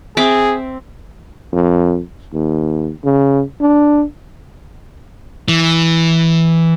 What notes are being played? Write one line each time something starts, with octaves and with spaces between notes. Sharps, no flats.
C4 G#4 E5 D6
F2
D#2
C#3
D4
E3